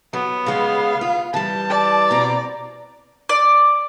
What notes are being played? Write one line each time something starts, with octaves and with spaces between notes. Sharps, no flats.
F#3 B3
C#3 G#3 F5
F4
E3 G3 A5
D5
B2 C4 A#5
D5